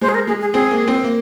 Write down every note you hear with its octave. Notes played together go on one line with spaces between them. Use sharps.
G#3 C5
G#4
A#4
G#3 G#4
G#4
C4 G#4
A#3
C4
A#3